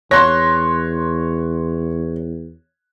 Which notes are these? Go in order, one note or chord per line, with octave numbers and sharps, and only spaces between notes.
E2 C#5 C6 F#6 A#6